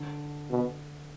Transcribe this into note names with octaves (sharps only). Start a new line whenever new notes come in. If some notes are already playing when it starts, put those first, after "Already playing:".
Already playing: D3
B2